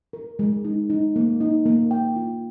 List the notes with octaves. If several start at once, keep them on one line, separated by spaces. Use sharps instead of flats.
A#4
G#3
D#4
D#4
A#3
D#4
A#3
G5
F4